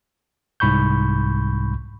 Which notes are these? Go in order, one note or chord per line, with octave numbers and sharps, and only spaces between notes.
C2 G#2 B5 C#6 G6